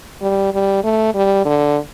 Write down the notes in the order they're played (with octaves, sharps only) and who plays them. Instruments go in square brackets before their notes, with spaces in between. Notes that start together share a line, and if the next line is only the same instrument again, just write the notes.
[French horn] G3
G3
A3
G3
D3